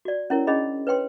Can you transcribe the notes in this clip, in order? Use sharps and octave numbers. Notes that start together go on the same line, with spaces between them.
F#4 D5
C#4 E4 A#4 C#5
C#4 D4 G#4 D#5 B5
B4 C#5 G5 C6